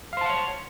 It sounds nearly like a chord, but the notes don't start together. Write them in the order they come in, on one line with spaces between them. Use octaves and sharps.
F5 C5 A5 F#5 C#5